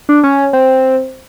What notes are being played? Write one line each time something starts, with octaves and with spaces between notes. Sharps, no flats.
D4
C#4
C4